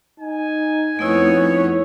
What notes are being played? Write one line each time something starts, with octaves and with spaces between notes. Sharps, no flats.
D#4 G#5
F2 A3 B3 D#4 E4 C#5